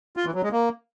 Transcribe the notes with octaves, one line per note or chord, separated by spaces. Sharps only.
F4
E3
F#3
G#3
A#3